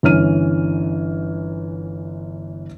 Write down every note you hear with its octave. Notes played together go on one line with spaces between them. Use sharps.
G1 E3 C#4 F6 D#7